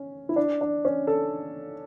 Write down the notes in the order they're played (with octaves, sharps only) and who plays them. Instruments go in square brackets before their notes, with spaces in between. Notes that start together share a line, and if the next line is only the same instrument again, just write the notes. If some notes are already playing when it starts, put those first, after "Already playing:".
Already playing: [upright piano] C#4
E4
D4
D4
C#4
A4